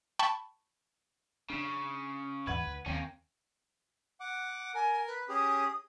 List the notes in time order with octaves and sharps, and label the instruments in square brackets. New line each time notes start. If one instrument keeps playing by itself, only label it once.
[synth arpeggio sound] G5 A5 B5 C#6
[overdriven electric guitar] C#3 [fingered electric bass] D4 [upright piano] C7 E7
[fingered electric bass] D#2 G#2 E3 [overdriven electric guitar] B4 [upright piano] F#5 G#6
[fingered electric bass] D2
[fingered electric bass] D#2 D#3 C4 [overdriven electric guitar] A#3 C#4 [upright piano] G5
[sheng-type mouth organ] F#5 D6
[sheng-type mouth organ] A#4 [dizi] G#5
[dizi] B4
[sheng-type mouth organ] C#4 G4 G#4 [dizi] D#6